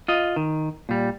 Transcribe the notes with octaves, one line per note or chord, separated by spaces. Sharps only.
F4 D#5
D#3
A#2 G3